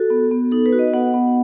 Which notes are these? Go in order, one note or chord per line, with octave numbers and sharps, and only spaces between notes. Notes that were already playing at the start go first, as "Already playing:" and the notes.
Already playing: F#4 A4
B3
B3
D#4 A4
B4
F#4
D#5
B3 F#5
B3